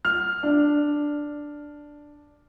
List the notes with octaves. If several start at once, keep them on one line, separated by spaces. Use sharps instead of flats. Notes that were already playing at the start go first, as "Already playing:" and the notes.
F6
D4